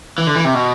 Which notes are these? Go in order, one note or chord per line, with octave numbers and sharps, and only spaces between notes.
E3
D3
E3
C3
B2